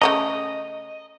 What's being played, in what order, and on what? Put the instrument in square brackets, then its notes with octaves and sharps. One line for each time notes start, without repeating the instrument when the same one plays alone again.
[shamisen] C#3 A3 A#5 [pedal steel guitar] D#5